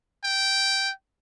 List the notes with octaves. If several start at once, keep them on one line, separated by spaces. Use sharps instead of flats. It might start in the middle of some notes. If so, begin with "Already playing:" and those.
G5